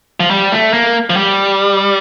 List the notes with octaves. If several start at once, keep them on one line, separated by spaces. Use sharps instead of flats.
F3
G3
A3
A#3
F3
G3